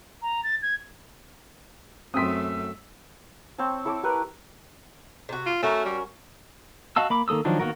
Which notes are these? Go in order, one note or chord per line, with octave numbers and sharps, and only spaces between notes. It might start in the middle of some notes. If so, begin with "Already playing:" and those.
A#5
A6
G#6
F#2 A3 C4 G5 C6 D#6 E6 B6
C4 C#5 A5
E4 A4 C#5 D6
G4 A#4 B4
C3 F#4
F4
A3 C#4 F#4 A#4
G3
F#4 D#5 F5 A5 E6
A#3 B5 D6
D#3 A#3 A4 D#6 E6
D#3 F3 F#3 D4 D#4
D#3 A#3 B3 F#4 A#4